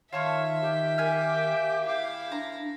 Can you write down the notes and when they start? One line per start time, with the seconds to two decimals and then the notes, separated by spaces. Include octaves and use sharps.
0.13 D#3 F4 C#5 E5 A5 F6
0.61 G4
0.98 A#3 G#5 F6
1.83 E4 F5
2.32 D4 A#5